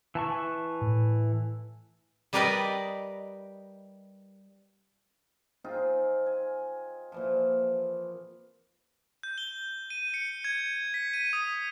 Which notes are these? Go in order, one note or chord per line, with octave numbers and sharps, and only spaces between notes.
E3 A5 C#6
A2
G3 G4 A#4 B4 D5 D#5
C4 D#4 F4 G#4
G#5
A#2 E3 F3
G6
G7
D#7
C#7
G#6
B6
D#7
D#6